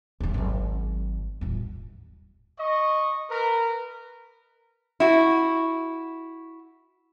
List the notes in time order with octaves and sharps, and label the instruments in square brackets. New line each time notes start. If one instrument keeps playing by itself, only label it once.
[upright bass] D1 D2
G#1 F#3
D#1 A1
[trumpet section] D#5 C#6
A#4 B4
[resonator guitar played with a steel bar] E4 F#4